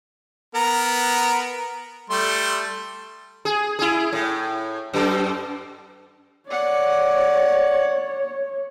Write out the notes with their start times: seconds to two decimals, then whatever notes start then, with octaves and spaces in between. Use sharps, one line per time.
0.55 B3 A#4 A#5
2.10 G3 A3 C6
3.45 G#4
3.79 E4 G#4
4.13 A2
4.94 F#2 A4
6.49 C#5 D5 F#5